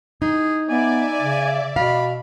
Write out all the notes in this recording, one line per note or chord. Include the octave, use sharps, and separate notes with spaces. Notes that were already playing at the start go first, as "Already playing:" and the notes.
D#4 G#4
B3 D5 E5 G#5
C#3
B2 F5 B5